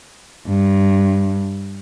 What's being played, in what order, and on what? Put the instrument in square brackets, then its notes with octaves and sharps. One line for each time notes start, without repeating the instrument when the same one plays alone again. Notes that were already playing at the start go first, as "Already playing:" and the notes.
[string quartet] G2